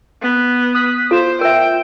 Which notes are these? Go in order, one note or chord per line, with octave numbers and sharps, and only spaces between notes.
B3
D#6 F#6 B6
F4 A4 C5 E7
A#4 E5 G5